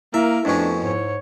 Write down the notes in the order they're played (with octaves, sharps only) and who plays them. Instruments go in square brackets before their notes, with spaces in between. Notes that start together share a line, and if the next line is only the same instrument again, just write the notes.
[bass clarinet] A#3 [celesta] E4 [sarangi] A#4 [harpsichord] E5
[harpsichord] F2 B2 C#4 [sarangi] A3 [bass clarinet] D4
[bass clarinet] G#2 [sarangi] C#5